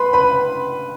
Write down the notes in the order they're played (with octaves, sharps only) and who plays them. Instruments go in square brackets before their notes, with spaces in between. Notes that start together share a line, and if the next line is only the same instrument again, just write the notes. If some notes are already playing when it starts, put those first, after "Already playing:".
Already playing: [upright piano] B4 B5 C6
B4 B5